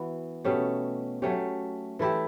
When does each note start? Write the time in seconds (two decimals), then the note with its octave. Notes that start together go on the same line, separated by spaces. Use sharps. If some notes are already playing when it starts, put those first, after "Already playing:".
Already playing: E3 B3 F#4
0.44 B2 A3 C#4 G4
1.22 F#3 A3 C#4 G4
1.99 E3 A3 E4 G4